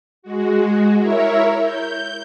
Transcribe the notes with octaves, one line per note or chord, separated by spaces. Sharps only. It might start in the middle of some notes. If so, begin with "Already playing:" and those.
G#3 F#4
E4 A#4 C#5 E5
G6